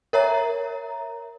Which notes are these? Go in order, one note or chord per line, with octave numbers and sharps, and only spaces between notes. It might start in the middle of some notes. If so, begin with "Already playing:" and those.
A#4 C#5 E5 A#5